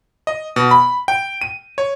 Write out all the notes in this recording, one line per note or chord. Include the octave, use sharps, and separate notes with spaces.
D#5
B2
B5
G5
D#7
C#5